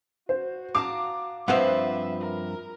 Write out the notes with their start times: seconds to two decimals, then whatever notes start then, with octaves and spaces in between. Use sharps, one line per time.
0.29 F#4 C5
0.75 F5 A5 A#5 D6
1.48 G2 F3 C4 B4 E5 F#5
2.21 A#4